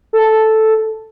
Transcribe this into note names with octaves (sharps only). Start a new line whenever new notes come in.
A4